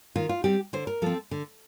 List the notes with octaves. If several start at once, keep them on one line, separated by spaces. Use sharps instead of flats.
D#3 F4
F4
G3 C4 G4
D3 C5
A#4
F3 C4 A4
D3